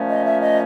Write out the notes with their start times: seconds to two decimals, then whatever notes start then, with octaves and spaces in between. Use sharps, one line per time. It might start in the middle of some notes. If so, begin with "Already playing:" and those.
Already playing: A#2 F3 A3 C#4
0.09 D#5
0.25 E5
0.41 D#5